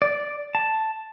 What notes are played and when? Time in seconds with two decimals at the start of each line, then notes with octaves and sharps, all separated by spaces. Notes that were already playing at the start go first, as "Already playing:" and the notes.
0.02 D5
0.55 A5